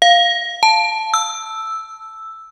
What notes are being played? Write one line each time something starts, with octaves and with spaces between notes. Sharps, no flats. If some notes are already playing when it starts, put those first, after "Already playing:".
F5
A5
E6